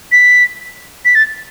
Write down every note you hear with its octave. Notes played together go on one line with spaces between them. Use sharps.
B6
B6
A6